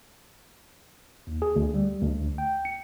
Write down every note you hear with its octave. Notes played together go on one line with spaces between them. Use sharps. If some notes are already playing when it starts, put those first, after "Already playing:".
D#2
G#4
D2
G3
D2
G5
C#7